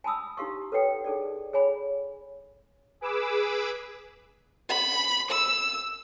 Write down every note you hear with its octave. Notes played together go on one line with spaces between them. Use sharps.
G#5 A5 B5 D#6 E6
D#4 E4 G4 F5 C6 C#6
A4 B4 C#5 F#5 G5
D#4 G#4 A4 D5
G#4 C#5 G#5 B5
G#4 B4 D6 E6
B5
E6